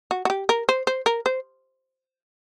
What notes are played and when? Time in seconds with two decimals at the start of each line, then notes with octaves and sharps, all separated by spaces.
0.11 F#4
0.25 F#4
0.30 G4
0.49 A#4
0.69 C5
0.87 C5
1.06 A#4
1.26 C5